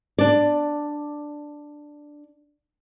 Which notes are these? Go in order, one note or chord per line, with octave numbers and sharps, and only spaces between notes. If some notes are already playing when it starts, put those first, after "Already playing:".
D4 D5